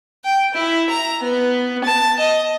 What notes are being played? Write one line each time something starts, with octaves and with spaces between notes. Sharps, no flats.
G5
E4
A#5
B3
A5
D#5